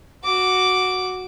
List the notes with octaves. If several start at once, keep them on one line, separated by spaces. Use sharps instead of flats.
F#4 D6